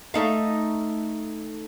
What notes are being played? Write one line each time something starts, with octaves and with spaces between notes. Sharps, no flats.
A3 D#4 F5